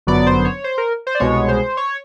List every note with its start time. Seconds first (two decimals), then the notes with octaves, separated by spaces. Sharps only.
0.07 G1 F#2 D3 F#3 B3 D5
0.27 C5
0.45 C#5
0.64 C5
0.78 A#4
1.07 C5
1.15 D5
1.20 C2 B2 G#3 B3 C#5
1.48 C5
1.77 C#5